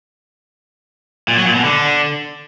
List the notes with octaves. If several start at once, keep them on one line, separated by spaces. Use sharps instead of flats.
A#2
F#3
A#2
B2
D3